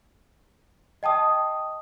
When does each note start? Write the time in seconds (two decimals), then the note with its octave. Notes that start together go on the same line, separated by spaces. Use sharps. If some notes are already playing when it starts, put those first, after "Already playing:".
1.03 D#5 G5 A5 D#6